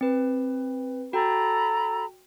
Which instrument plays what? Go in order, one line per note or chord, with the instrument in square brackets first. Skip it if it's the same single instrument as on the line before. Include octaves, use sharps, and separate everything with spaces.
[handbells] C4 B4
[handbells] F#4 G5 [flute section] A4 A#5 B5